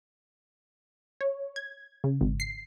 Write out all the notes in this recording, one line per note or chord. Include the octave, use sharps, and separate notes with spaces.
C#5
G#6
C#3
G#1
C7